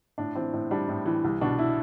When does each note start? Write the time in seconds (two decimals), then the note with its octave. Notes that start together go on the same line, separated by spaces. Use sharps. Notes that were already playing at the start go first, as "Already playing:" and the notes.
0.18 A2 D4
0.35 E3 C4
0.53 A2
0.71 G3 D4
0.89 A2
1.06 E3
1.24 C2
1.41 B2 D4
1.59 E4